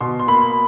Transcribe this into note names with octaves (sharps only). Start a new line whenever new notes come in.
B2 C6
C6
A#3 B5